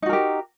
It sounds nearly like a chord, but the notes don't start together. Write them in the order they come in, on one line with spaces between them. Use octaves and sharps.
D#4 F#4 A#4 G4